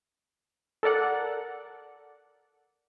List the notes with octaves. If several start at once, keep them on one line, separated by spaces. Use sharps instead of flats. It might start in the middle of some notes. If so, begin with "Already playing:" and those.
A4 A#4 D5 F#5